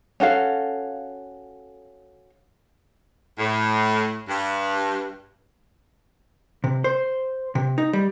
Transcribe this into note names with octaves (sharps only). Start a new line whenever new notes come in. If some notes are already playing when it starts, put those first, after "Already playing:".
C#4 F#4 A4 F5
A2
G2
C3
C5
C3
D#4
G3